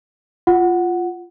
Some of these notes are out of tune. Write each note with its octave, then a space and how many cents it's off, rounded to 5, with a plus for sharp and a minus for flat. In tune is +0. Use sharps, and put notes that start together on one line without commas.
F4 -5 F#5 +0